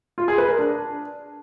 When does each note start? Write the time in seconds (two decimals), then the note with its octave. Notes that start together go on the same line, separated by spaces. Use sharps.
0.18 F4
0.28 G#4
0.38 B4
0.48 A#4
0.59 D4